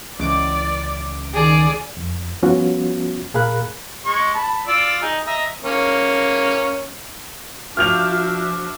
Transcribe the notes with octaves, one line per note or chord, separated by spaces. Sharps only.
C#2 E3 D5 D6
D#3 G#4 D5
F2
F3 G3 B3 C#4 F4 F#4
A#2 G#4 A#4 F5 B5 F#6
G#3 C#6
A5 B5
F4 D5 E6
D#4 G#4
D#5 E5 A#5
A#3 C#4
F3 D4 F4 F#4 E5 F6 G6 F7